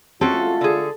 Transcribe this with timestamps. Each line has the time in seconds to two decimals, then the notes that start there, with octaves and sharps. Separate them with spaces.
0.21 G#3 A3 C4 C#4 F4 F#4 A4
0.61 D3 G#4